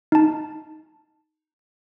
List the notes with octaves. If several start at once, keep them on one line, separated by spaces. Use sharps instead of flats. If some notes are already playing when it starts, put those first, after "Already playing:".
D#4 A5